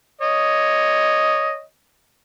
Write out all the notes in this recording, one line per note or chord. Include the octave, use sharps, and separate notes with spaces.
C#5 D#5